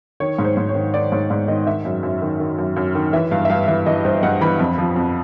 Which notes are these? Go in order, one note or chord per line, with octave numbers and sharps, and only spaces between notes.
D#3 C#5
G#2
C5
G#2
C#5
D#3
D#3 D5
G#2 C#5
G#2 D5
D#3 D#5
D#3 E5
F#2
F#2
D#3
D#3
F#2
F#2
D#3
E3 E5
G2 F5
E5
G2 F5
E3 E5
E3 D#5
G2 C5
G2 F#5
E3 B5
F2
F3
F2